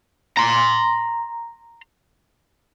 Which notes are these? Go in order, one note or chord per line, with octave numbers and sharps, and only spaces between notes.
A#5 C6